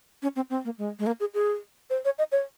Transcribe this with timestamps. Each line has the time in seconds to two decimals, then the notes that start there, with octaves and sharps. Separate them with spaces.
0.22 C#4
0.36 C4
0.50 C4
0.65 A#3
0.78 G#3
0.99 G#3
1.07 A#3
1.20 G#4
1.34 G#4
1.90 C5
2.05 C#5
2.18 D#5
2.32 C#5